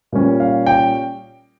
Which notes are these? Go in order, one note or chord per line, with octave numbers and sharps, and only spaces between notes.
A#2 G3 C#4
F5
G5